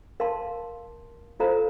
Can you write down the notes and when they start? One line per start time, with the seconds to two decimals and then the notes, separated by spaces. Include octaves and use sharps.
0.20 A#4 F5 A5 C6
1.40 F4 A4 C5 F5 A#5